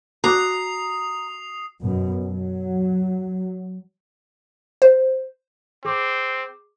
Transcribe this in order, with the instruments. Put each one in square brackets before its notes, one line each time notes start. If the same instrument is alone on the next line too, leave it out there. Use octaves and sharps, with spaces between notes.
[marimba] F#4 D6 F#6 [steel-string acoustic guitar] A#5 [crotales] D#6 C7 F7
[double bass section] F#2 B2
F#3
[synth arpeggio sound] C5
[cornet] C4 [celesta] G#4 D6